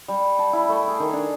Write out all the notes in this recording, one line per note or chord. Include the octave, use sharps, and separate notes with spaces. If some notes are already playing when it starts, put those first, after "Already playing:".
G3
A5
E4
A3
G#4
D#3
D4